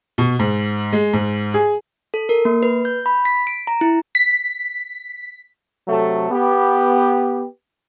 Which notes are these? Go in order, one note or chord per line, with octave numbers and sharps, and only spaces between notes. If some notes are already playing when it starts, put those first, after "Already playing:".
B2
G#2
G#3
G#2
G#4
A4
A#4
A#3
B4
G6
B5
B6
D7
A#5
E4
B6
C3 F#3 A3 A4
B3 G4